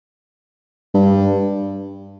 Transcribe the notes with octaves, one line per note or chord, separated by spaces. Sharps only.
G2